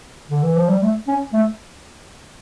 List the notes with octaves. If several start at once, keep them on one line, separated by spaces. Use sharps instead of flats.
D3
E3
F3
G3
A3
C#4
A3